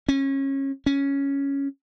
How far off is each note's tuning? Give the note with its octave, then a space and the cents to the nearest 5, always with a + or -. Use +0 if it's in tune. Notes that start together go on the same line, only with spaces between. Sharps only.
C#4 -25
C#4 +0